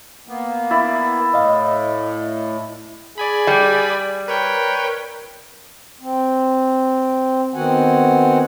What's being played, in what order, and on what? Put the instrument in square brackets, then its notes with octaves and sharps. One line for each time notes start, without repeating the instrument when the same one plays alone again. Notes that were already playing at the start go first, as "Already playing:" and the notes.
[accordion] A#3 B3
[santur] E4 D5
[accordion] A2 [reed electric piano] D#5 F5
[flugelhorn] G#4 [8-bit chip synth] D5 G#5 B5
[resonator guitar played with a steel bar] G3
[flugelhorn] A#4 [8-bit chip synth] B4 C#5 G5
[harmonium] C4
D#3 B3 C4 F#4 F#5 G#5